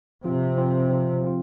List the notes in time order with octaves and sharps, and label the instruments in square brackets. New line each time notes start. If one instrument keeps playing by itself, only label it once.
[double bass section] C3 [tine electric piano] F3 C4 F4
[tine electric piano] F3 C4 F4
F3 C4 F4
F3 C4 F4